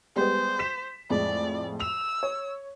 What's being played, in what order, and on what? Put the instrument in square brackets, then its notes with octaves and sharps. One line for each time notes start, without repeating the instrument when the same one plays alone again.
[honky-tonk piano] G3 G#3 B3 [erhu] C5
[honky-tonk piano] B6 E7
[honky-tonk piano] F2 A2 G#3 [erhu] D5
[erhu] E6 [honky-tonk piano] F7
[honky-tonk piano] C#5